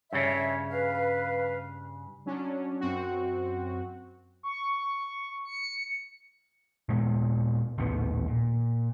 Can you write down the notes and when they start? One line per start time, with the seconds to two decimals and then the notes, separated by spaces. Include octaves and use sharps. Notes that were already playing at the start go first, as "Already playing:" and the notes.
0.13 G2 C#3 C#5 E5
0.69 B4 F5
2.26 F#3 C#4 D4
2.80 F#2 C4 F#4
4.43 C#6
5.45 C#7
6.89 A#2 G#3 B3
7.78 A#1 D#2 A2 B3
8.28 A#2